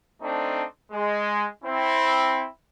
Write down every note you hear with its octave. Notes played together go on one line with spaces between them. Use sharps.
A3 C4 D4 D#4
G#3
C4 E4